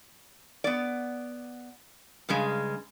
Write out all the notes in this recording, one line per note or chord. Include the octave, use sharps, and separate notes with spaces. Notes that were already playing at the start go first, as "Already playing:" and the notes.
B3 D5
G2 C#3 G#3